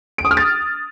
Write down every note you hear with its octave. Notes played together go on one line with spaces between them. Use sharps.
D7
D#6
F6
A6